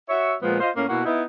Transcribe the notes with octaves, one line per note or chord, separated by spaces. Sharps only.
F#4 C#5 E5
A#2 F3 G#3 B3
F4 C5 D#5 F5
A2 A#3 C#4
B2 A#3 E4 F#4
B3 D#4 E4